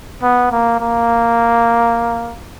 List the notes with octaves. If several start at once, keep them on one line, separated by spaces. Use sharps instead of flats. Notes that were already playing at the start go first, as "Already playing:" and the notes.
B3
A#3
A#3